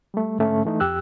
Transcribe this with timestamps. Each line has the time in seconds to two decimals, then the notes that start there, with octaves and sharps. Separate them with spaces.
0.14 G3 A3
0.39 G#2 D3 A3 C#4
0.65 E3 A3 D#4
0.80 F2 G4 E6 F#6